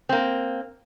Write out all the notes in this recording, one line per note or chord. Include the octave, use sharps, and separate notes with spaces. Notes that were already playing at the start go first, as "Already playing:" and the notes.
A#3 C4